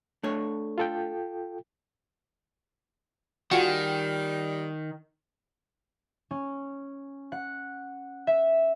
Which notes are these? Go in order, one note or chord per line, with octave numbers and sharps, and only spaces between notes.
A3 D4 C#5
F4 A4 G5
D#3 G3 F4 F#4 G#4
C#4
F#5
E5